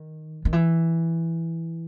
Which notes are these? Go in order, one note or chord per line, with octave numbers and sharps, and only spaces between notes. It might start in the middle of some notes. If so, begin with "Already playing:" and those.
Already playing: D#3
D#3
E3